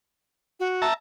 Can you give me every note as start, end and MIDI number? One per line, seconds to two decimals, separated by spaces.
0.60 0.85 66
0.82 0.94 76
0.82 0.94 81
0.82 0.94 82